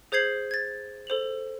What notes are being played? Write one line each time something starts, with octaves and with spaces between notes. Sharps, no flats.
G#4 C5 G6 G#6 C7 F#7
G#6 A6
A4 C5 F7 F#7